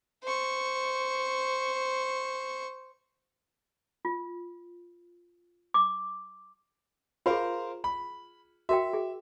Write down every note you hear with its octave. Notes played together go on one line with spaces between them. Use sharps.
C5 C#6
F4
D6
F4 G#4 A#4 C5 F5
B5
F#4 A#4 E5 G5
G#4